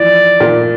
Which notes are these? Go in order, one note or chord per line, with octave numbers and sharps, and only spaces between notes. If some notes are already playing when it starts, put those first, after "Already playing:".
Already playing: E3 F3 D5
A#2